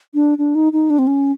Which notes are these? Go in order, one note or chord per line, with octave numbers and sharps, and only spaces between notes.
D4
D4
D#4
D#4
D4
C4
C#4